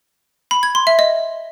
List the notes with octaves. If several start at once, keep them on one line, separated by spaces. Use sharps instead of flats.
B5
G#6
C6
E5
D#5